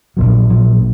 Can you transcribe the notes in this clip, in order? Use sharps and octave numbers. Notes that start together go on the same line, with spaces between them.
A#1 A#2 F#3
A#1 A#2 F#3